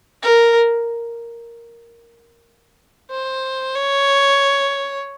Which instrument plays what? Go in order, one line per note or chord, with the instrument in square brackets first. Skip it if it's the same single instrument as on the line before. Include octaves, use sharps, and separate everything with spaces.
[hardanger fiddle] A#4
C5
C#5